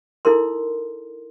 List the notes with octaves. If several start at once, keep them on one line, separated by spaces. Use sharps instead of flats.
D#4 E4 A4 A#4 C6